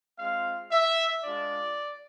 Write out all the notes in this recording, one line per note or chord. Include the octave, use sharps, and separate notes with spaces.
G#3 C4 F4 F5
E5
G#3 D4 F4 D5